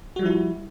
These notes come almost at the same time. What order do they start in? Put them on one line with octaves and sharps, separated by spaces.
F#4 G3 F3 E4